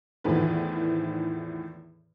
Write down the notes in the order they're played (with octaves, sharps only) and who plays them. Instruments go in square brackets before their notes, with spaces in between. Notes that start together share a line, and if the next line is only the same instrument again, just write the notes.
[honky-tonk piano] E2 A2 D#3 F3 B4